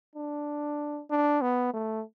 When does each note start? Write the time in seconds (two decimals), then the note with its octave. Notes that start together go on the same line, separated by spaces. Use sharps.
0.16 D4
1.11 D4
1.42 B3
1.74 A3